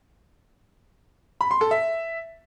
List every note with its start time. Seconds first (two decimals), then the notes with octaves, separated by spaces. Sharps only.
1.41 B5
1.51 C6
1.61 A4
1.71 E5